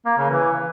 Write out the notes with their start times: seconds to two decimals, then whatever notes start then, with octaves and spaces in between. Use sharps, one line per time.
0.06 A#3
0.18 C#3
0.30 E3